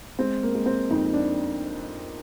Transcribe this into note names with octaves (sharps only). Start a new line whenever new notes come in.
G#3 C4
A#3
G#3
C4
F2 D#4
D4